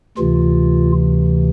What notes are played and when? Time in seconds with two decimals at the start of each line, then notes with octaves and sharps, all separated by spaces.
0.17 D2 C3 E3 F4